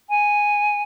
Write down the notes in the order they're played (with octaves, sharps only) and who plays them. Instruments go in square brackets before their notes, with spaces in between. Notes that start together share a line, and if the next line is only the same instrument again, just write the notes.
[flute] G#5